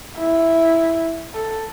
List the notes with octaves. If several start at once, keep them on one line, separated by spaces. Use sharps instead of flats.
E4
A4